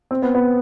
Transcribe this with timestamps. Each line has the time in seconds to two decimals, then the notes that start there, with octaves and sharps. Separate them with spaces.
0.11 C4
0.22 B3
0.35 B3